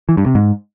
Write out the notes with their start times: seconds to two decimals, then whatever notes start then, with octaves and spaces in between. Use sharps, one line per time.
0.09 E3
0.17 G2
0.26 C3
0.35 G#2